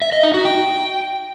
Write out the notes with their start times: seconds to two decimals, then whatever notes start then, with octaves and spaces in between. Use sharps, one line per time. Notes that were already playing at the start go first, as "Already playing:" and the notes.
0.02 E5
0.12 D#5
0.23 D#4
0.34 F#4
0.45 G5